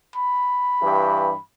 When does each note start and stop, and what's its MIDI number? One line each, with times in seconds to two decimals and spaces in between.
0.16 1.41 83
0.82 1.32 43
0.82 1.32 52
0.82 1.32 67